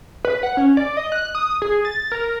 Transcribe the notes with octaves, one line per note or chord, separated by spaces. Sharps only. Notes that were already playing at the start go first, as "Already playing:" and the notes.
B4
F#5
C#4
D5
D#5
F#6
D#6
G#4
A6
A#4